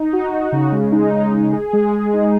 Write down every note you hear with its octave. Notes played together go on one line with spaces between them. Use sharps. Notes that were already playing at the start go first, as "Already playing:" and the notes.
Already playing: D#4
F#4
F#4
C#3
G#3
D#4
G#3
G#3
G#4
G#3
G#3
D#4